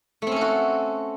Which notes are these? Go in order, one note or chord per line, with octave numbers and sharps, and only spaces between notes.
A3 C4 C#4 F#4 A4